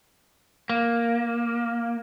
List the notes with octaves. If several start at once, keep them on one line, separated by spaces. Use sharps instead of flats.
A#3